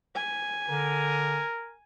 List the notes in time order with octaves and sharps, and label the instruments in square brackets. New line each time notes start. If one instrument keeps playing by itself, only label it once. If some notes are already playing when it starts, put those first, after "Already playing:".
[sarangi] G#5
[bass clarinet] D3 [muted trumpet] A#4